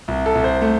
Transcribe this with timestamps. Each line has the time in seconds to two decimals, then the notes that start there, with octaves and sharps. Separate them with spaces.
0.08 C2
0.26 A4
0.35 C2
0.44 C5
0.61 A3